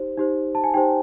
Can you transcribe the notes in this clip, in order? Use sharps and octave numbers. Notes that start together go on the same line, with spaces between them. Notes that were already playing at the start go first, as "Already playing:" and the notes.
Already playing: D#4 G4 C5
D#4 G4 C5
A5
G#5
D#4 G4 C5 G5